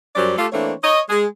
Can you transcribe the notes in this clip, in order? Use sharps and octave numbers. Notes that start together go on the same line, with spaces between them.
F#2 F#3 G3 C#4 C5 D5
A3 F4 G4 A4
E3 A3 A#3 C4 D4 C#5
C#5 D#5
G#3 G#4